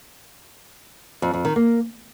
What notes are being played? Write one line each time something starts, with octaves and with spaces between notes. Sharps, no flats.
F2
F2
D#3
A#3